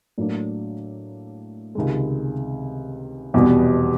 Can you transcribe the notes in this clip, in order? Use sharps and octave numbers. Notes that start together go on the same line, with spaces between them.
A2 F#3 A#3 D4
C#2 C3 D#3 G#3
F1 E2 B2 G3 B3